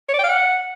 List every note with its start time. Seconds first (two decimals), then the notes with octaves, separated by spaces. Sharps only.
0.09 C#5
0.14 D5
0.19 G5
0.24 F5
0.29 F#5